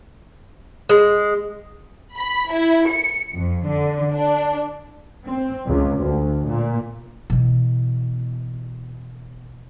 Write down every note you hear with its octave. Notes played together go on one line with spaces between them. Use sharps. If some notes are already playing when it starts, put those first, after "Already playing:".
G#3
B5
E4
C#7
F2
D3
D4
C4
C#2
D2
A#2
B2 E3